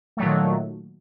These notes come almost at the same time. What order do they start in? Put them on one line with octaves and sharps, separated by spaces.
A3 F#3 A#2 D#3